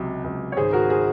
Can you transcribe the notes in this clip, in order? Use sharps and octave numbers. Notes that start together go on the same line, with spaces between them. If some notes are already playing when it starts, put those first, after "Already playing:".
Already playing: C#2 C3 F#3
C#2
C#5
G#1 G#4 C5
F#4 A#4
G#4 C5